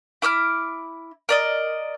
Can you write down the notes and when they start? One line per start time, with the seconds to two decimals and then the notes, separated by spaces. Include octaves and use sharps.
0.22 E4 D6 E6 F6
1.29 A#4 D5 D#5